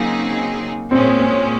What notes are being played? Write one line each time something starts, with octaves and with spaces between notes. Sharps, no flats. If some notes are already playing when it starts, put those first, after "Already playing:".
Already playing: C#3 F#3 A#3 C4 D#4 G#4
A#2 G#3 C4 C#4
C4